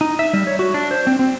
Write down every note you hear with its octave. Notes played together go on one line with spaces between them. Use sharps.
D#4
E5
G3
C#5
F#4
D4
C5
C4
C4